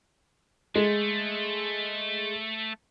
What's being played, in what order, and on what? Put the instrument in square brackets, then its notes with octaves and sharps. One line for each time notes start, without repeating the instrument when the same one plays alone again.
[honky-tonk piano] G#3 [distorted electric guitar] A3